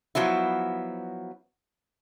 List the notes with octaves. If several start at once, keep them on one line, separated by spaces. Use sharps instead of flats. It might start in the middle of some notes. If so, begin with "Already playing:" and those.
F3 F#3 B3 E4